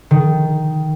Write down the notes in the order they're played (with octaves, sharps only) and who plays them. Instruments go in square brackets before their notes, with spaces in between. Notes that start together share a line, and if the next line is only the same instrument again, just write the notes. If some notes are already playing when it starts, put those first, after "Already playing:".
[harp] D#3